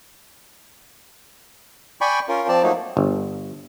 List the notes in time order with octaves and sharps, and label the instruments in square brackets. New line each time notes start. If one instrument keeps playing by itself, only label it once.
[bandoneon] D5 G5 G#5 B5 C#6
C#4 F4 A#4
F3 C4 D5 A5
F3 F#3 A3 A#3 D#4
[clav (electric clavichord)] G1